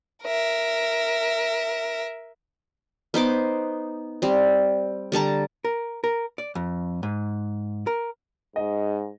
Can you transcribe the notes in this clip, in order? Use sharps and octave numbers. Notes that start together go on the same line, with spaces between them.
A#4 E5
B3 D#4 C5 D6
G3 C4
D3 G3 A5 A#5
A#4
A#4
D5
F2
G#2
A#4
G#2 D#5